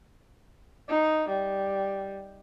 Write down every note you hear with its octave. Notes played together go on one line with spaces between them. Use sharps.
D#4
G3